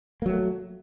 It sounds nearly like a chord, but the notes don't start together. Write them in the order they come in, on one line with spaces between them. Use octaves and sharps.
A#3 F#3 A3